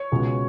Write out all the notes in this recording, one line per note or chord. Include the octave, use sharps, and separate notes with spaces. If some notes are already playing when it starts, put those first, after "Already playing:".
Already playing: C#5
C#2 B2 G#3